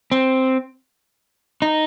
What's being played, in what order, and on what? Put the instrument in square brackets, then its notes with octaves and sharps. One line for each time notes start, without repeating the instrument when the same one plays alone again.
[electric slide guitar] C4
D#4